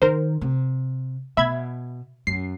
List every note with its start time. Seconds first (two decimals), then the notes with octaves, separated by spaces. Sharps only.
0.02 D#3 A#4 C5
0.41 C3
1.37 B2 E5 B5 G#6
2.27 F#2 C7